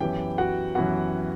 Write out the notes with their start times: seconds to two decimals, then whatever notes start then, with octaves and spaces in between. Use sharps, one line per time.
0.01 F#2 E3 B3 G4 G5
0.38 F#4 F#5
0.75 F#2 E3 B3 F#4 F#5